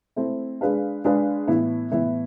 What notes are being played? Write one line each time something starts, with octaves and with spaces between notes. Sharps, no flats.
A3 C4 E4
G#3 D4 G#4 B4 F5
G#3 D4 G#4 B4 F5
A2 E3 B3 E4
A2 E3 B3 E4